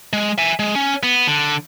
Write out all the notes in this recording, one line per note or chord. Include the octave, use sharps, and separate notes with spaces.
G#3
E5 G#5
G#3
C#4
B3
D3